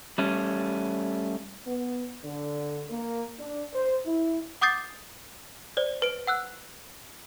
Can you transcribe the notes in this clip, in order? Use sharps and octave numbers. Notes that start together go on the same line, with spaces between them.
G3 A3 C#4
B3
D3
A#3
D4
C5
E4
F#5 D6 D#6 G6 A6 C7
C5 D5
B4 D7
F#5 E6 F#6